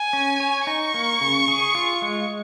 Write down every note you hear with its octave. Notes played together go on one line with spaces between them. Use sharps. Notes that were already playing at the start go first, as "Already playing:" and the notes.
Already playing: G#5
C#4
C#5
D#4 C#6
A#3
C#3
G#4
F4
G#3